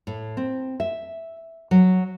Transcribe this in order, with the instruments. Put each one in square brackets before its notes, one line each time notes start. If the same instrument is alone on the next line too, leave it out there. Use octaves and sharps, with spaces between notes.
[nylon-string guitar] A2
C4
E5
F#3